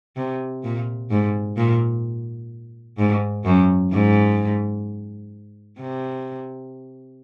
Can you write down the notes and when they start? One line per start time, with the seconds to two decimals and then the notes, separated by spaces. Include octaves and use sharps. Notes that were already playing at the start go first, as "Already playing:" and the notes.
0.17 C3
0.64 A#2
1.11 G#2
1.57 A#2
2.98 G#2
3.45 F#2
3.92 G#2
5.79 C3